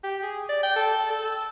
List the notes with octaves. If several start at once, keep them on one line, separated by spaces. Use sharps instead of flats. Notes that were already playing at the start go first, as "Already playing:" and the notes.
G4
G#4
D5
G5
A4
A4
A4